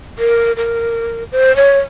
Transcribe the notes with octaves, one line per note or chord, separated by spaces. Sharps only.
A#4
A#4
C5
C#5